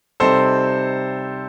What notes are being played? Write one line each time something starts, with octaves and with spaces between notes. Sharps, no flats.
C3 G3 C4 D#4 A4 C5